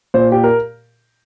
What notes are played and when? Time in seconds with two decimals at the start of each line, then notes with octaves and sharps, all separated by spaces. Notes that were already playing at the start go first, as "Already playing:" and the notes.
0.14 A#2 C5
0.32 G4
0.44 A#4